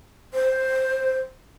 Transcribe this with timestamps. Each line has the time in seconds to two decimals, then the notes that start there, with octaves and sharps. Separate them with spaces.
0.34 C5